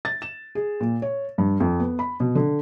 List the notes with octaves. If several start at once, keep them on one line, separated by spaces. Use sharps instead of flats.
A6
E7
G#4
A#2
C#5
G2
F2
B3
B5
B2
D3